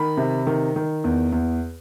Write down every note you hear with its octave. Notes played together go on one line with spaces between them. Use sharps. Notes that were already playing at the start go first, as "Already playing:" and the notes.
Already playing: D#3 B5
C3
D#3
D#3
E2
E2